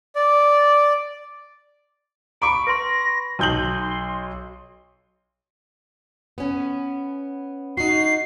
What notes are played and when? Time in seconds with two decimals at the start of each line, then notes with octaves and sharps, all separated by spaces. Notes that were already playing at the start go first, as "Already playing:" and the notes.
0.16 D5
2.42 A#5 B5 C#6 D6 D7
2.67 B4 C6 A#6
3.39 B1 D#4 C6 G6 F#7
6.38 B3 C#4
7.77 D#4 F#4 C7